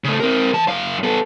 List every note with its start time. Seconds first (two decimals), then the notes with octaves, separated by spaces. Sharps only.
0.04 C#3 A3
0.20 C4 A#4
0.53 E3 A5
0.68 F#2 F5
1.03 B3 A4